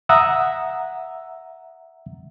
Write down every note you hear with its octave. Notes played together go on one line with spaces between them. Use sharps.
E5 F#5 A#5 D#6 E6